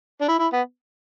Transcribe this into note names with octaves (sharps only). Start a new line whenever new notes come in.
D4
E4
E4
B3